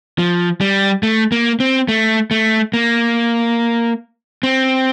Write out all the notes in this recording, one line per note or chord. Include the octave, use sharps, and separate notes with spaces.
F3
G3
A3
A#3
C4
A3
A3
A#3
C4